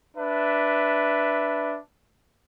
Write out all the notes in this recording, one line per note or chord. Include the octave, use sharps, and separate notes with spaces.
D4 B4 E5